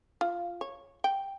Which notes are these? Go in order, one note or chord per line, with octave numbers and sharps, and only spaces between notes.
F4
C#5
G5